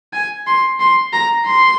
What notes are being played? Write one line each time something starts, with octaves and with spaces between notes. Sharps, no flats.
G#5
C6
C6
A#5
C6